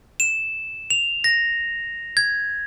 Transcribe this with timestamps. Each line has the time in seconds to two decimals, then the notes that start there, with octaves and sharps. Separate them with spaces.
0.20 E7
0.90 F7
1.24 A#6
2.17 G#6